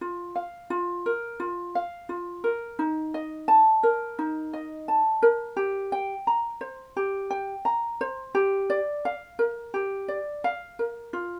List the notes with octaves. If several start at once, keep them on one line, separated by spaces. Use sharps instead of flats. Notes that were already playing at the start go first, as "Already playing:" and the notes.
F4
F5
F4
A#4
F4
F5
F4
A#4
D#4
D#5
A5
A#4
D#4
D#5
A5
A#4
G4
G5
A#5
C5
G4
G5
A#5
C5
G4
D5
F5
A#4
G4
D5
F5
A#4
F4